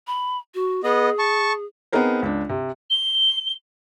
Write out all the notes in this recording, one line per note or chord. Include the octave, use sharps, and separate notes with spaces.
B5
F#4
B3 G#4 D#5
A5 C#6
B3 C4 D#4 G#4 A#4 C5
C#2 D4
C3
G7